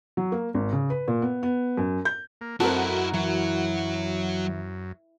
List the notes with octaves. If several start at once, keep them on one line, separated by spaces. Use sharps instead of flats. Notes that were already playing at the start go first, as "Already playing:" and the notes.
F#3
A#3
G#1
C#3
B4
A#2
B3
B3
F#2
G6
A#3
F#2 C4 E4 F#4 A4 A#4 D#5 A5
E3 F#3